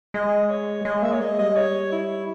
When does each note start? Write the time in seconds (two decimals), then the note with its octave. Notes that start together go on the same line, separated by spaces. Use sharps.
0.14 G#3 D#5
0.49 C#5
0.85 G#3 D#5
1.02 A#3 E5
1.12 C#5
1.20 G#3 D#5
1.38 G3 D#5
1.56 C#5
1.92 E4